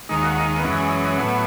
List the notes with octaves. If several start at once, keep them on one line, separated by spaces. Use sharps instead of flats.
D#2 D#3 G#3 D#4
F#4
D#4
B3
F#2 E3 G#3 C#4
A2 F#3 B3